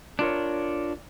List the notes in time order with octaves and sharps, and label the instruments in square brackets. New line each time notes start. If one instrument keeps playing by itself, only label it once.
[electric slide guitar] D4 F4 A#4 C#5